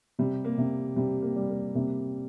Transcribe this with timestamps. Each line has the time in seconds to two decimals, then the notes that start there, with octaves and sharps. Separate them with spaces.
0.19 C3 G3
0.45 A#3
0.58 C3
0.96 C3 G3
1.22 A#3
1.36 G3
1.49 A#3
1.74 C3 A#3